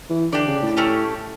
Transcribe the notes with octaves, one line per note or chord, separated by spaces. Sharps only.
E3
D3 D4 G4 D5
C#3
A2
A3 C#4 G4